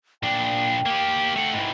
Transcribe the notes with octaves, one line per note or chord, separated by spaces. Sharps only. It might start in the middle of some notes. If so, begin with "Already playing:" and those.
A#2 D4 G5
A#3 G4
A3 F#5
G#2 E3